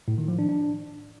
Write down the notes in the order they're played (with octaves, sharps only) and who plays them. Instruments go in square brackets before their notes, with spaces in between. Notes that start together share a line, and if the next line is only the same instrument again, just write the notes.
[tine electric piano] A2
D#3
F3
D4
D4